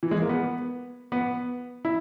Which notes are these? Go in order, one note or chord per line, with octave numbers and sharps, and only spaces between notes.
E3
G#3
A#3
B3
B3
E4